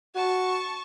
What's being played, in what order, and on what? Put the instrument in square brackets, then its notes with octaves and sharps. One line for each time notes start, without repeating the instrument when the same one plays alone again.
[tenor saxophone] F#4 [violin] A5 C#6